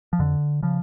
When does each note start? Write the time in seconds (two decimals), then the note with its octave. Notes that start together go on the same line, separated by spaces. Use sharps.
0.13 F3
0.19 F2 D3
0.63 C#3 F3